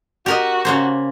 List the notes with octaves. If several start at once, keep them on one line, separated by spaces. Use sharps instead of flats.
F#4 G4 A#4 D#5
C#3 A#3 C5